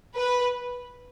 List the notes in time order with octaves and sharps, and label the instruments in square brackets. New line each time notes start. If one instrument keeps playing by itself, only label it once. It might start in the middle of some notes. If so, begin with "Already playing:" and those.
[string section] B4